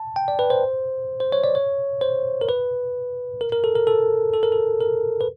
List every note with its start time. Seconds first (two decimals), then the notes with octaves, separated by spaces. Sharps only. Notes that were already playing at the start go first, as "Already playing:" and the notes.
Already playing: A5
0.16 G5
0.28 D5
0.39 B4
0.50 C5
1.20 C5
1.32 C#5
1.44 D5
1.55 C#5
2.01 C5
2.41 A#4
2.48 B4
3.41 A#4
3.52 A#4
3.64 A4
3.75 A#4
3.87 A4
4.34 A4
4.43 A#4
4.52 A4
4.80 A#4
5.21 B4